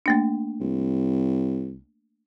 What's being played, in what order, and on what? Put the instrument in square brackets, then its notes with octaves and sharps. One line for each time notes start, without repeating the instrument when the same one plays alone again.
[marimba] A3 A#3 D4
[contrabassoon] C2